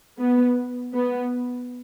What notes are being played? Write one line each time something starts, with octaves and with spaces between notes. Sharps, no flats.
B3
B3